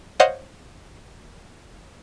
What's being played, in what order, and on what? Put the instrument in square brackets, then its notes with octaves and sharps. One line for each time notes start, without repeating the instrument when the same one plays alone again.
[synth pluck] C5 C#5 D#5 F5 F#5 G6